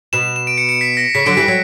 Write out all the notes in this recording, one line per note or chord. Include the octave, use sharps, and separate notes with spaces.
B2 E7
E7
D7
C#7
C#7
B6
A#6
C#3 B6
D3 F#3 D7
E3 G3 B6
F#3